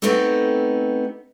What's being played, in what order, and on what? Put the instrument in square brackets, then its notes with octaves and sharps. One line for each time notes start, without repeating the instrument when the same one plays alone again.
[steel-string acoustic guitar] A3 B3 C4 D#4 G4 A4